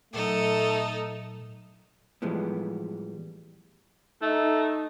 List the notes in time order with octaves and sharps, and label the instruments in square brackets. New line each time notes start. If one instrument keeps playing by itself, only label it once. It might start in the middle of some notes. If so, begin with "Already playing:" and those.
[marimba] A#2 F#3 [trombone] A3 [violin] D#4 A4
[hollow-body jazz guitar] A2 E3 F3 G3 G#3 B3
[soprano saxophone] A3 [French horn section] D#4